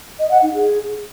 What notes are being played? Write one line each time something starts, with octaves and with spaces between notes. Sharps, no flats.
D#5
F#5
D#4
G#4